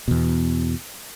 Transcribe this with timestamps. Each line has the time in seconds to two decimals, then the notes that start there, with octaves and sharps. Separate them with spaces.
0.08 E2 B2